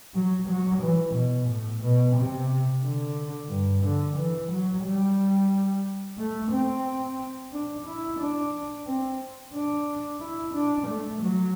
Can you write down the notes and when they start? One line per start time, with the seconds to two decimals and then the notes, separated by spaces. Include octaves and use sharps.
0.15 F#3
0.48 F#3
0.82 E3
1.15 B2
1.48 A2
1.82 B2
2.16 C3
2.83 D3
3.49 G2
3.83 D3
4.16 E3
4.51 F#3
4.84 G3
6.18 A3
6.51 C4
7.52 D4
7.86 E4
8.19 D4
8.86 C4
9.53 D4
10.20 E4
10.54 D4
10.87 A3
11.21 F#3